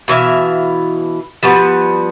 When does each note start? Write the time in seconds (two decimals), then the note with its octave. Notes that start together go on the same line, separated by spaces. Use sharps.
0.08 B2 E3 E5 F5
1.43 F3 G3 B3 F#4